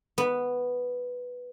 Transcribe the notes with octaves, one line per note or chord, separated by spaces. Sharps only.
B3